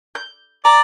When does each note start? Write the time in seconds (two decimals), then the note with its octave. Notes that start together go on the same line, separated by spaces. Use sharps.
0.15 G6
0.65 D5 A#5